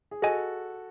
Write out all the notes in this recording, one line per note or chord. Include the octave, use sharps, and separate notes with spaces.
G#4
F#4 G#4 A4 D#5 G#5